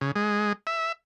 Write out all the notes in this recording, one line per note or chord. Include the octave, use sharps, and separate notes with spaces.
C#3
G#3
E5